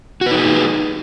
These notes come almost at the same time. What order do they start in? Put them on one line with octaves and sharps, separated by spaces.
F#4 B4 D#4 G#4